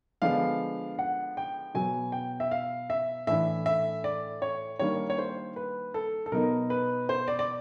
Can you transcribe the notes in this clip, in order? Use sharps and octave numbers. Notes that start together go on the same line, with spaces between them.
D3 F3 G#3 B3 D4 F5
F#5
G5
B2 F#3 B3 G#5
G5
E5
F5
E5
A2 E3 A3 D4 E5
E5
D5
C#5
D#3 G3 A#3 D4 C#5
C#5
C5
B4
A4
A4
B2 F#3 B3 D#4 A#4
B4
C5
D5
D5